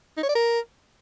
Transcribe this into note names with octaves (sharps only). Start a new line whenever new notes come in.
D#4
C#5
D5
A#4